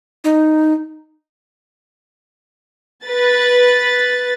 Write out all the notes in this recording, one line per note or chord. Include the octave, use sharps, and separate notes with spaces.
D#4
B4 A6